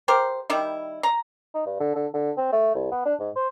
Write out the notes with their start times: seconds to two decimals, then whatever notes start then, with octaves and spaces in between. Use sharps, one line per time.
0.08 G4 A#4 C5
0.50 D#3 G3 E4
1.03 A#5
1.54 D#4
1.66 G2
1.80 D3
1.95 D3
2.14 D3
2.37 C4
2.52 A3
2.75 C2
2.91 B3
3.05 D4
3.20 G#2
3.36 C5